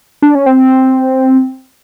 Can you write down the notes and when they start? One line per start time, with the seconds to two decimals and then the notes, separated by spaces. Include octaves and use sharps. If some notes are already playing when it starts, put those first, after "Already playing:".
0.22 D4
0.35 C#4
0.46 C4